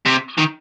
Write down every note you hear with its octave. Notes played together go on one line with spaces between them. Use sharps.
C3
D#3